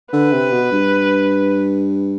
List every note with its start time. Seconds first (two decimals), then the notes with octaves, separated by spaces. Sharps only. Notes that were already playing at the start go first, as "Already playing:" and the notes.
0.13 D3 B4
0.33 C3
0.52 B2
0.72 G2